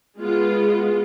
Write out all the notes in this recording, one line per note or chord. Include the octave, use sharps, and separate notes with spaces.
G#3 B3 F4